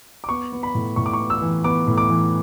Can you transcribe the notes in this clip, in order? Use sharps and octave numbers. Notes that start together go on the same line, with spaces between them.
D6
B3 C#6
B3
B5
A2
A2 C#6
D6
C#6
B3
E6
E3
B3 D6
A2
D6
E3